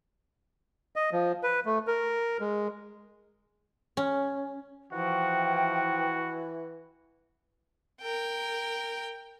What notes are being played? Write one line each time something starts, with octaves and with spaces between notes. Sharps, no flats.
D#5
F3
B4
A3
A#4
G#3
C#4
E3 F3 F#4 G5
A#4 G5